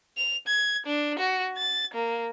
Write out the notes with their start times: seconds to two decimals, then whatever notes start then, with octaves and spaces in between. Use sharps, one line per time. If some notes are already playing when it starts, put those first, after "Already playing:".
0.17 F7
0.47 G#6
0.86 D4
1.19 F#4
1.57 A6
1.94 A#3